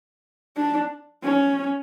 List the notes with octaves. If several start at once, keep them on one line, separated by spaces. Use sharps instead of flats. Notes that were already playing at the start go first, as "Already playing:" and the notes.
D4
C#4